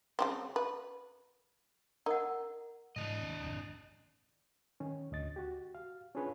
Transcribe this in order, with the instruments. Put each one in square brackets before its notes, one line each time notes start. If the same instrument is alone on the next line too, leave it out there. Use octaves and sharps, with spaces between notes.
[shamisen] C#3 G3 C4
B4
[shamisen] D#4 [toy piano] A#4 F#5
[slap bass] G#2 C#3 E3 [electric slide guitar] D4 D#5
[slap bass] D#2
G#1 F2 C3
[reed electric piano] D#3 C#4
D2 D#5 A6
F#4 G4
F5
C#4 D4 F4 G#4 B4 C#5